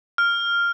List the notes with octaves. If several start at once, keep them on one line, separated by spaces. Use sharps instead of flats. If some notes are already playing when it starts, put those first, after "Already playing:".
F6